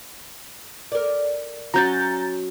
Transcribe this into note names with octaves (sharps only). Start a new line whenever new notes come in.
A#4 D5
F#3 C#4 F#4 A#5 G6 A6